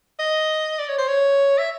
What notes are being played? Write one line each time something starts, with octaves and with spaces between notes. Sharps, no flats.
D#5
D5
C#5
C5
C#5
E5